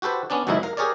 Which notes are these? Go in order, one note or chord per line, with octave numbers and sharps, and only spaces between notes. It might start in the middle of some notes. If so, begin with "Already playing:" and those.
F#4 G4 A4 B4 C5
B3 C#4 D4 D5
G#1 C#2 F#2 C3 D#4 E4
A#4 F5
G4 G#4 A#4 C#5 D5